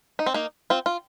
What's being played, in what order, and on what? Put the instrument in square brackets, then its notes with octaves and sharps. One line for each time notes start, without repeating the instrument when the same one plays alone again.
[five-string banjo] D#4
C4
A#3 D#4
C4 F4
F4